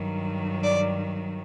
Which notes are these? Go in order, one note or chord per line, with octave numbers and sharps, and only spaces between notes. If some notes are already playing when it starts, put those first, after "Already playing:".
Already playing: G2 D#3 F#3
D5